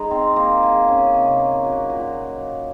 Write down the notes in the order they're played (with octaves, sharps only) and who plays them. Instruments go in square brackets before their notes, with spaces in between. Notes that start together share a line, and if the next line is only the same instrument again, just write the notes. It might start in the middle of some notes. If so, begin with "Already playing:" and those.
Already playing: [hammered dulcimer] G#3 D#4
C4
A#3
G#4
C#4
C3
A#3
F#3
A#2